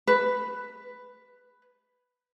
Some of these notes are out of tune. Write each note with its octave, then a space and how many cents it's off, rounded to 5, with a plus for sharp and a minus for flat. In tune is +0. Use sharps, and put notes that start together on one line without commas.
B4 +5